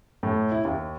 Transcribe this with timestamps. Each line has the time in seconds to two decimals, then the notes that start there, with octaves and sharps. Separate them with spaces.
0.23 A2
0.52 E4
0.65 D#2